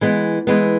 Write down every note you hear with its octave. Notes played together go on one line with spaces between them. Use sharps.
E3 G#3 B3
E3 G#3 B3